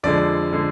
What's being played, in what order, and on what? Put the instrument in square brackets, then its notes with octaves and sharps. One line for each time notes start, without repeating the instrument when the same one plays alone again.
[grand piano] F2 D3 G#3 D5
D3 G#3